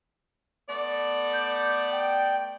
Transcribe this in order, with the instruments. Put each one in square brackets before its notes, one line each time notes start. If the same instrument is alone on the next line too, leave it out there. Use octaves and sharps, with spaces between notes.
[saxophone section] A3 B3 D5
[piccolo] G6
G5